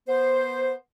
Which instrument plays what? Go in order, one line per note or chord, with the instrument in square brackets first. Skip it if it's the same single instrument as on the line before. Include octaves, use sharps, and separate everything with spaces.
[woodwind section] B3 C5